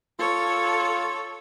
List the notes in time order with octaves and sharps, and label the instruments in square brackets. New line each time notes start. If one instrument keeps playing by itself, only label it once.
[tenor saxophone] F4 [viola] A4 C#5